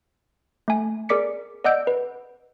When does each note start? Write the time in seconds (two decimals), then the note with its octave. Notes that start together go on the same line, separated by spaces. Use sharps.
0.68 A3 G#5
1.09 G#4 A#4 D5 D6 B6 C#7
1.64 D5 D#5 F#5 E6 G6 D7
1.87 B4